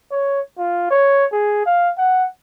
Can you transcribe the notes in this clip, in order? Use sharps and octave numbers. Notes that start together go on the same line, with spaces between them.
C#5
F4
C#5
G#4
F5
F#5